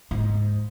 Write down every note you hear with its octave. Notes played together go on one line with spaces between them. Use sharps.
G#2